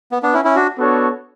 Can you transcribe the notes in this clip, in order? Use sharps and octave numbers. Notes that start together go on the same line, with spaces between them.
B3
B3 D4
C#4 E4
C#4 E4
D4 F#4
B3 D4 F#4 A4 C#5